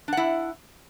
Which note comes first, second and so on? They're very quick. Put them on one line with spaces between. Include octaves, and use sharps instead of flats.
D4 F#5 E4